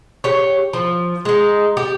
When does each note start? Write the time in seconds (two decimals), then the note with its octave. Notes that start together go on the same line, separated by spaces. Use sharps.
0.24 G4 C#5
0.73 F3
1.25 G#3 D#4
1.77 G4